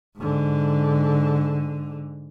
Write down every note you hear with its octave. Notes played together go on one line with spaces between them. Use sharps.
G#2 D3